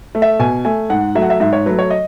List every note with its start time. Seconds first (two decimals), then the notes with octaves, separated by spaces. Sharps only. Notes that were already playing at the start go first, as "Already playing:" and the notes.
0.15 A3
0.22 E5
0.39 B2 G#5
0.65 A3 G#5
0.90 G#2 F#5
1.15 F#3 A3 E5
1.22 F#5
1.30 E5
1.40 G#2 E5
1.53 C#5
1.66 F#3 A3 B4
1.79 C#5
1.90 D#5